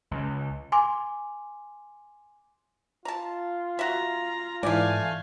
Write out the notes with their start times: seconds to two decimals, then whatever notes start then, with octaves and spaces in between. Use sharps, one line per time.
0.11 C#2
0.72 G#5 C6 D6
3.05 F4 A5 A#5
3.79 F#4 E5 A#5
4.63 G#2 E3 A3 D5 F5 G#5